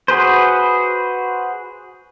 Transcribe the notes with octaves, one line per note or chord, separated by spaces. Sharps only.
F#4 G#4 B4 C5